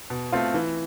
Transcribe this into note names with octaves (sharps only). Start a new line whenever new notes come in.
B2
A3 C4 F4
E3